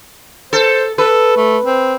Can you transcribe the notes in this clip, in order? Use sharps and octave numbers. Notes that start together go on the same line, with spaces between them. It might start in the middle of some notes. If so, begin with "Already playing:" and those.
A4 C5
A4 B4
A3
C4